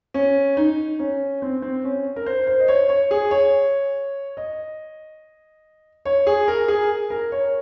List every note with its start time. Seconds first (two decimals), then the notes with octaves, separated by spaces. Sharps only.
0.14 C#4
0.57 D#4
0.99 C#4
1.42 C4
1.62 C4
1.84 C#4
2.16 A#4
2.26 C5
2.47 C5
2.60 D#5
2.68 C#5
2.89 C#5
3.11 G#4
3.31 C#5
4.37 D#5
6.05 C#5
6.27 G#4
6.48 A#4
6.68 G#4
7.10 A#4
7.32 C#5